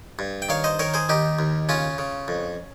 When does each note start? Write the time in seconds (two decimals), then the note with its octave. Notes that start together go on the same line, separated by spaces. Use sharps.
0.19 G2
0.42 G5
0.49 D#3 C#5 F5
0.64 C5 D#5
0.79 D#3 A#4 C#5
0.94 G#4 C5
1.09 D#2 D#4 G4
1.39 D#2
1.69 C#3 C#4 F4
1.98 C#3
2.28 F2